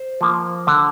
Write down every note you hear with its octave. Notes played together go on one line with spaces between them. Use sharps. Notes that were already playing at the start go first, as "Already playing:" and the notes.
Already playing: C5
F3 A#3
D3